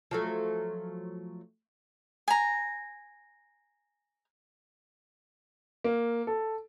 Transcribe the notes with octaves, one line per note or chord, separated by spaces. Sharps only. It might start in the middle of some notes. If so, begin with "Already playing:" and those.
F3 F#3 A3
G#5 A#5
A#3
A4